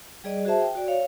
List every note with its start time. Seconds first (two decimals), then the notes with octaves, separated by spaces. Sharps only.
0.24 G3 G#4 D5 D#5
0.45 F#4 G#4 C5 E5 A5
0.61 G5
0.75 F#4 D5
0.88 C#5 F5